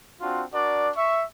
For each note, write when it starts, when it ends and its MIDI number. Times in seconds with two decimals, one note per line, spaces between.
0.21 0.44 60
0.21 0.44 62
0.21 0.44 65
0.21 0.44 66
0.53 0.91 62
0.53 0.91 66
0.53 0.91 70
0.53 0.91 74
0.97 1.23 76
0.97 1.23 85